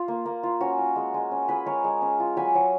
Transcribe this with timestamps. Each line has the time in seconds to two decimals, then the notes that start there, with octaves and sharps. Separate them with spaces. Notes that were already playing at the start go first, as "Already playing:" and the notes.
Already playing: F4
0.08 A#3
0.26 A#3
0.43 F4
0.61 C#4 F#4
0.78 F4
0.96 G#3
1.14 G#3
1.31 C#4
1.48 F4 G#4 B4
1.66 G#3 A#4 C#5
1.84 G#3
2.02 C#4
2.20 F4
2.36 F#3 G#5 B5
2.55 F#3